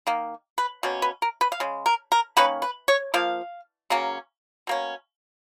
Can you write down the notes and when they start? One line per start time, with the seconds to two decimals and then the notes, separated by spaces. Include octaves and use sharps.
0.07 D#3 A#3
0.58 B4
0.83 B2 A#3 C#4
1.02 B4
1.22 A#4
1.41 B4
1.52 F5
1.60 C#3 G#3
1.86 A#4
2.12 A#4
2.37 D#3 A#3 C#4 B4
2.62 B4
2.88 C#5
3.14 F3 A#3 F5
3.90 C#3 F#3 A#3 C#4
4.67 B2 A#3 C#4